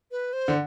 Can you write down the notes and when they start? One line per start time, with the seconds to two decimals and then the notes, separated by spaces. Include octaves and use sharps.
0.11 B4
0.33 C5
0.48 D3